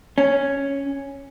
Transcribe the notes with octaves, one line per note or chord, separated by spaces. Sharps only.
C#4